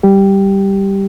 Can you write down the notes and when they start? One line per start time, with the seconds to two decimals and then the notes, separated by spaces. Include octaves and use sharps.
0.03 G3 G4